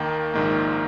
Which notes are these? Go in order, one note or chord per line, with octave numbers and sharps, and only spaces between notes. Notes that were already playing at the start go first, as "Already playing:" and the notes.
Already playing: D#2 D#3 A#3
A#1 G#2 D#3 A#3